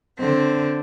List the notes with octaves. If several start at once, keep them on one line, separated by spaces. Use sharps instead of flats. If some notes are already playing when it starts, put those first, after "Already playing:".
D3 C4